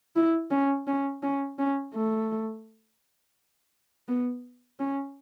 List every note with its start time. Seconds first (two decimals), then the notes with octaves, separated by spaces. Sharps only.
0.16 E4
0.51 C#4
0.87 C#4
1.23 C#4
1.59 C#4
1.94 A3
4.08 B3
4.80 C#4